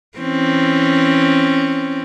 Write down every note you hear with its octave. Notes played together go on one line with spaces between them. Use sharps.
E3 C4 C#4